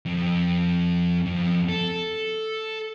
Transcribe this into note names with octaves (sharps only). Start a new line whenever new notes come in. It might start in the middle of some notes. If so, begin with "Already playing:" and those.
F2
F2
A4